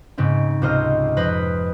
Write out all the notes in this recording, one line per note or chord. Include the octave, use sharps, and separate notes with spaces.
G#2 C#3 C4 C#4
C#2 C3 F4 C5 D#5 F6
F2 B4 C5 B5 D#6 A#6